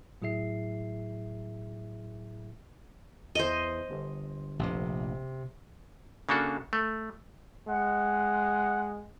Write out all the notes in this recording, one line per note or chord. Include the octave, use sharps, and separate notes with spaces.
A2 F#3 E4 G#4 E5 C7
E2 C5 D#5
G1
F1 A#1 C3
C#3 A#3 D4 F#4 A4
A3
G#3 F#5